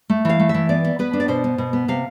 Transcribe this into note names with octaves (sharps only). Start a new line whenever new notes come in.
A3
E3 F5
A3
E5
E3
B3 D5
B3
B3 B4
D4
D5
B2 C5
B3
B2
B3
C3 F5